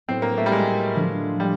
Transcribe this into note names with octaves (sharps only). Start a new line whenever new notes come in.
A2 F#3 B3 C4 E4
A#3
A3
G3
G#3
D3 F3 A3 D4
G3